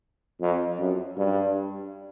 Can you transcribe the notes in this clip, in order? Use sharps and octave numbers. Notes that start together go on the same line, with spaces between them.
F2
F#2
G2